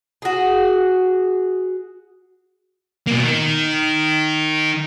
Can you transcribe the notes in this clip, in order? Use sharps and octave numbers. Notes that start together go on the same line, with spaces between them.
F#4 G#4
B2 A#3
D#3